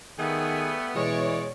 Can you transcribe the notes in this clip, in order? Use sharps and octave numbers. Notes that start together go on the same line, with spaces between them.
D#3 G3 A3 B3 G#4
B2 E3 G#3 C#5 D5